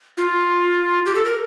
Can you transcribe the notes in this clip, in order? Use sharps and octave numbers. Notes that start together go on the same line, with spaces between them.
F4
G4
A4
A#4